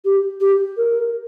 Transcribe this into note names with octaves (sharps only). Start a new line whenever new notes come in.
G4
G4
A#4